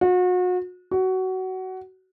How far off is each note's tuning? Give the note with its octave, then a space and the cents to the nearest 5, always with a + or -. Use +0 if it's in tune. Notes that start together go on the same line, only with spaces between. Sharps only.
F#4 -35
F#4 +20